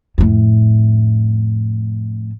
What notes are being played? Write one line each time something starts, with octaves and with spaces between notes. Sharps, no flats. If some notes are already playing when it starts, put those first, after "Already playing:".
F2 A2